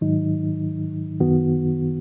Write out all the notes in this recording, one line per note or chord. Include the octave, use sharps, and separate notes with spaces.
G#2 D#3 F#3 D#4
F#2 D#3 B3 F#4